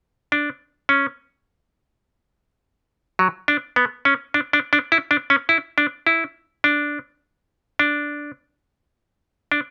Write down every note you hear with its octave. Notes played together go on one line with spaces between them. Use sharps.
D4
C#4
F#3
D4
B3
C#4
D4
D4
D4
E4
D4
C#4
E4
D4
E4
D4
D4
D4